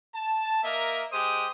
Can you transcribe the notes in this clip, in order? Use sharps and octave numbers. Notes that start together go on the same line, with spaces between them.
A5
A#3 A#4 D#5 E5
G#3 G4 C5 D#6